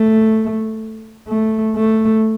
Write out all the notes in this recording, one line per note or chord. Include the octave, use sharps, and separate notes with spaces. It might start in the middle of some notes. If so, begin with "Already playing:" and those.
Already playing: A3
A3
A3